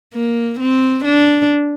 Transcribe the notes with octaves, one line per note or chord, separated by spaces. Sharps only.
A#3
C4
D4